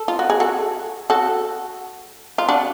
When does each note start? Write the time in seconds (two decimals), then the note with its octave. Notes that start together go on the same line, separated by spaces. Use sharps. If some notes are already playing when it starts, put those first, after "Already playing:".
Already playing: A4
0.08 F4
0.19 F#4
0.30 G#4
0.40 F#4 A4
1.10 F#4 A4
2.38 F4
2.49 D4 F#4